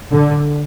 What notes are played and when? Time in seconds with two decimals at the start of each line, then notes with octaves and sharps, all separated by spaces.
0.12 D3